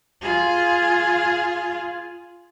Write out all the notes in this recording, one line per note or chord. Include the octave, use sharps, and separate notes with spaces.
F4 G#4